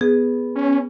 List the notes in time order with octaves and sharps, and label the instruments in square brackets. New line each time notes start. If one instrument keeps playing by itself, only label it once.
[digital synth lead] B3 [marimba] G#4
[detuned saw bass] C#4